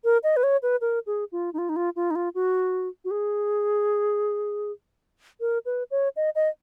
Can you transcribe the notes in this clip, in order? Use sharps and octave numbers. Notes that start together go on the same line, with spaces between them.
A#4
D#5
B4
C#5
B4
A#4
G#4
F4
D#4
F4
D#4
F4
F4
D#4
F4
F#4
F#4
G#4
A#4
B4
C#5
D#5
D#5